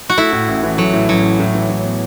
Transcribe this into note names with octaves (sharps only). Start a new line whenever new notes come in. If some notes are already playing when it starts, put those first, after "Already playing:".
F#4
A3 E4
A2
A1
E3
F#3 A3
A2
A1 F#3
E3
A2
E3
A2
B3